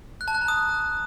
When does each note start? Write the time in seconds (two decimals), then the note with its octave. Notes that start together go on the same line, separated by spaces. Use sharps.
0.21 F#6
0.28 A5
0.35 F#6
0.41 A#5
0.48 D#6